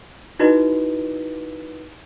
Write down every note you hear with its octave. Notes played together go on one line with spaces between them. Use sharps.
D#4 E4 F#4 B4 D#5